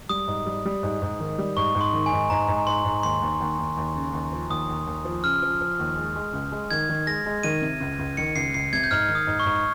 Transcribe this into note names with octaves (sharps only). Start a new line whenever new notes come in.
G3 D#6
G#2
G3
G3
G#2
G#2
D#3
G3
G#2 C#6
G#2
C6
D#3
G#5
G#2
G#2 A#5
G#2
G#2 C6
G#2
D#2 C6
D#2
D#2
D#2
D#2
C#3
D#2
F3
D#2 D#6
D#2
D#2
F3
C#3 F6
F3
F3
D#2
G#3
G#3
C#2
G#3
D#3 G#6
D#3
G#3 A#6
G#3
D#3 D#7
C3
C#2
C#2
D#3 C#7
C#2 C7
C#2 C7
C3 G#6
G6
G#2 F6
D#3
D#6
G#2
C#6
G#2